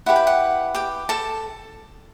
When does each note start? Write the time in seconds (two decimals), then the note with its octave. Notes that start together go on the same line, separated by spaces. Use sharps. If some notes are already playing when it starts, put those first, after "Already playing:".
0.06 E4 G4 B4 F#5
0.16 G5
0.27 F#5
0.75 G4 G5
1.09 A4 A5